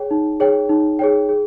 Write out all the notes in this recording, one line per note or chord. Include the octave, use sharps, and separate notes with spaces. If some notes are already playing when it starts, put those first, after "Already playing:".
Already playing: G#4 C#5 G5
D#4
G#4 C#5 G5
D#4
G#4 C#5 G5
G#4